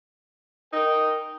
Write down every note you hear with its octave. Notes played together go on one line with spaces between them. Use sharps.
D#4 A#4 G5